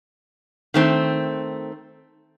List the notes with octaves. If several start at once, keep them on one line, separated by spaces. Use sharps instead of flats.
D#3 A3 C4